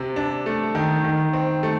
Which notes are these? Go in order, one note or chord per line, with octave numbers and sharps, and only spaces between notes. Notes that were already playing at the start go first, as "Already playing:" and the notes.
Already playing: C3
D4
A3
D#3
D#3
C4
A3